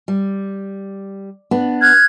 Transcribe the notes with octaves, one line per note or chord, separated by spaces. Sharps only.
G3
B3 D4
F6 F#6 G#6